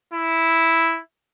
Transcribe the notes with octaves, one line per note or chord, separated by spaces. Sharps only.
E4